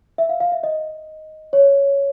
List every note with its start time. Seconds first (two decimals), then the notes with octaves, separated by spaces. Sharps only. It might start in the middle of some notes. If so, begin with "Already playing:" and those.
0.18 E5
0.29 F5
0.40 F5
0.52 E5
0.63 D#5
1.53 C#5